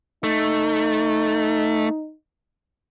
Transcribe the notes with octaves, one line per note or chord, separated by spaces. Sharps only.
A3 D#4